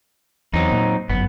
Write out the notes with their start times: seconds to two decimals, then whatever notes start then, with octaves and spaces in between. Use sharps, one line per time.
0.54 E2 F#3 C4 D#4
0.72 A#2
1.10 G1 F#2 B3